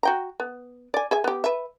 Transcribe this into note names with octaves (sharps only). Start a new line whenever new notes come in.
F#4 G5 A#5
B3
D5 G#5
G#4 E5 G#5
B3 G4
B4 E5